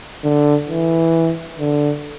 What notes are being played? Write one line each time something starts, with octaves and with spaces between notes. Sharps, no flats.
D3
E3
D3